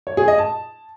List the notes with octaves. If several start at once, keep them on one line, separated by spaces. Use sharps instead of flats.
C#5
G#4
D#5
A5